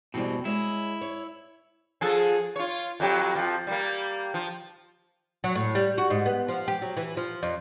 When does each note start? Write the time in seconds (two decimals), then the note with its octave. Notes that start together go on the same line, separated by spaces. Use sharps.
0.14 F2 B2 E3 G3 C4
0.45 G#3 E4 C#5 D#5
1.01 C#5
2.01 F3 G#4 A4
2.56 F4 C#5
3.00 F2 F#3 G4
3.35 F2 F3
3.67 G3 A#3
4.34 F3
5.44 F#3
5.55 A2
5.75 G3
5.98 F#4
6.10 G#2
6.26 B3
6.48 F3
6.68 G4
6.82 F#3
6.97 E3
7.17 F3
7.43 F2